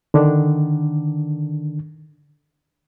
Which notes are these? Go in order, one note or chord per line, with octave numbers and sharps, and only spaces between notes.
D3 D#3 D4